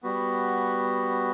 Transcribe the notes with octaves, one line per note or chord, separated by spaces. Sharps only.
G3 B3 F#4